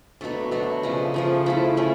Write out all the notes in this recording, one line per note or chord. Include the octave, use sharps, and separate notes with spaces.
B2 F#3 A3 D4
B2 F#3 A3 D4
C#3 F3 A3
C#3 F3 A3
F3 A3 C#4 E4
F3 A3 C#4 E4